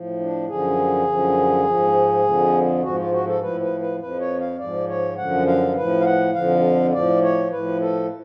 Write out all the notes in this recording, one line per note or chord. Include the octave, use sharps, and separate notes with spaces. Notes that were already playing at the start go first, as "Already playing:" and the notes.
Already playing: A2 F3
D4
F#2 D3 F3 G#4
F#2 D3 F3
G#2 F3
F2 D3 F3
G#2 F3 F#4
F4
F#4
A4
A2 F3 B4
B4
B4
F2 F3 B4
C#5
F5
G#2 F3 D5
C#5
F#2 D3 F3 F#5
F5
A2 F3 B4
F5
F#5
F2 D3 F3 F5
A2 F3 D5
C#5
A2 F3 B4
A4